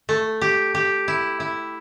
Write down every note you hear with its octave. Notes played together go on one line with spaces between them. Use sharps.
A3
G4
G4
E4
E4